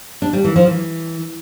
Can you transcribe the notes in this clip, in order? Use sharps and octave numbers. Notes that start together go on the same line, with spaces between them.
D4
G3
E3
F3
E3